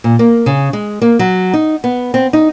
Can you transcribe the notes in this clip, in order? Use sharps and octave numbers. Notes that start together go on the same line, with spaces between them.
A#2
A#3
C#3
G#3
A#3
F#3
D#4
B3
C4
D#4